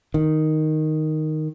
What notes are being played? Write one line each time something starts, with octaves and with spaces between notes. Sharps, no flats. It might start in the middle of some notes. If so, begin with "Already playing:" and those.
D#3